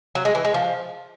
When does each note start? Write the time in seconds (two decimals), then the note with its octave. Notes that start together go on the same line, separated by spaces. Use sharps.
0.15 F#3
0.25 G#3
0.35 E3
0.45 G#3
0.54 F3